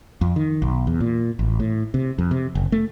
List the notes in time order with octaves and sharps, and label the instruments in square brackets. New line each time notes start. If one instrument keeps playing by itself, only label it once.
[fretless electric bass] F2
D#3
B1
E2
A#2
A1
A2
C3
F2
C3
F#1
A3